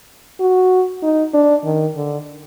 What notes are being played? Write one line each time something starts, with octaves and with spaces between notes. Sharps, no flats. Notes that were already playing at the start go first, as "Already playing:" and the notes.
F#4
D#4
D4
D#3
D3